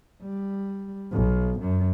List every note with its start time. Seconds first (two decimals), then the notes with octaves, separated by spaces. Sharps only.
0.22 G3
1.11 B1
1.60 F#2